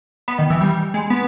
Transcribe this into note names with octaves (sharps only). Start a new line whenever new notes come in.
B3
D#3
E3
G3
G#3
B3